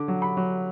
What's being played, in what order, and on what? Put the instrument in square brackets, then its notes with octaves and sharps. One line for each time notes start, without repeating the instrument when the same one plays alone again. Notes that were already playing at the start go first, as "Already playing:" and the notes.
Already playing: [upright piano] D3 D6
F#3
B5
F#3